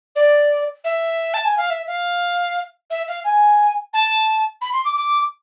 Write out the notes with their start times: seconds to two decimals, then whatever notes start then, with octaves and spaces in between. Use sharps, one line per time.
0.15 D5
0.84 E5
1.33 A5
1.44 G#5
1.57 F5
1.70 E5
1.87 F5
2.90 E5
3.07 F5
3.24 G#5
3.93 A5
4.61 B5
4.72 C6
4.84 D6
4.95 D6